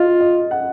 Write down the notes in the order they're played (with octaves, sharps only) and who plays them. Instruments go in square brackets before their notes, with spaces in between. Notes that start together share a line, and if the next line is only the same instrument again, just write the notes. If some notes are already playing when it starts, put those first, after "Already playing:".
Already playing: [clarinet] F4 [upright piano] D#5 F5
[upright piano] D#5
F#5